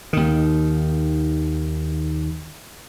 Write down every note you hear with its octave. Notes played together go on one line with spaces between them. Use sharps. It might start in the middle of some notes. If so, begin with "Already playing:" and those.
D#2 D#3